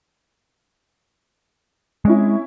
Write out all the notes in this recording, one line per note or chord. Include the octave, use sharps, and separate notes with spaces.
G#3 C4 C#4 E4